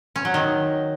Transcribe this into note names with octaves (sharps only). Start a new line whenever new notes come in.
C#4
F#3
D#3